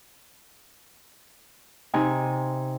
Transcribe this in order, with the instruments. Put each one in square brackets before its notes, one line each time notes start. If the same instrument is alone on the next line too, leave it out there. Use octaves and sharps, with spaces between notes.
[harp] C3 D#4 G#5